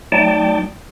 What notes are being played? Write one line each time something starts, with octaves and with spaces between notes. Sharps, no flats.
F#3 A3 D#4 D5 G5 A5